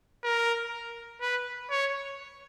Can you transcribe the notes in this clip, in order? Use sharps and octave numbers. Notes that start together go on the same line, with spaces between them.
A#4
B4
C#5